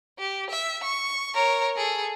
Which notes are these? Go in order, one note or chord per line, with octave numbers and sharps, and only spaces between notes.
G4
E5
C#6
A#4 C#5
G#4 A4